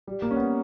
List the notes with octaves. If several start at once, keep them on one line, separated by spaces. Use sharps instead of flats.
G3
A#3
C#4
B3